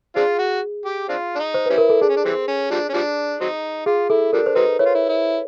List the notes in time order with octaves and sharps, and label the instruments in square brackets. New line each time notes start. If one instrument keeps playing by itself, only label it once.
[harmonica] C4 D4 F4 [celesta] G#4
[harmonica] F#4
G4
C4 D4 F4
D4
D#4
[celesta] C5
[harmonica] G3 C#4 E4 [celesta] B4
[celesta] A#4
A4
[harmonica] D4 [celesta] G#4
[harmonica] C#4
D4
E3 G3 C4
C#4
F3 G3 D4
C#4
F3 G3 D4
F#3 C4 D#4
[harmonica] F4 [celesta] G#4
[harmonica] E4 [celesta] A4
[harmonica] F3 G3 D4 [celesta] A#4
[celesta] C5
[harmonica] F#3 C4 D#4 [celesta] B4
[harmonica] E4 [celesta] C#5
[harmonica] F4
E4
E4